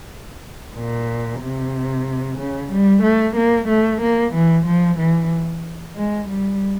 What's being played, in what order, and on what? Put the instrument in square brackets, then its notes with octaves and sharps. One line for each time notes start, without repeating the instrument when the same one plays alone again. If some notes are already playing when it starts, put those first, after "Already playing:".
[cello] A#2
C3
C#3
G3
A3
A#3
A3
A#3
E3
F3
E3
G#3
G3